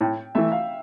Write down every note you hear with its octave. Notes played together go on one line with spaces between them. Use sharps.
A2 G5
E3 A3 E5
F5